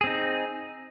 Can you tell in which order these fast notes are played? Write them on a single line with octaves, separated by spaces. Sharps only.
G#4 C4 D#4